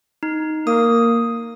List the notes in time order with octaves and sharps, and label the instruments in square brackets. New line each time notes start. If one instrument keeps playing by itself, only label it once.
[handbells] D#4
[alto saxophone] A#3 [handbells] D#6